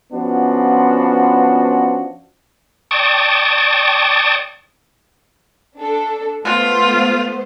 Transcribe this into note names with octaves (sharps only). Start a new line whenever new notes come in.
F3 B3 C#4 D4 F4 F#4
D5 G5 A5 C#6 D#6
D4 A4
A3 B3 F4 C5